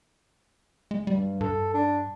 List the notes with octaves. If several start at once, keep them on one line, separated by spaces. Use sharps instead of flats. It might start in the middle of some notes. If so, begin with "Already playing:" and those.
G#3
G2 G3
G2 A4
D4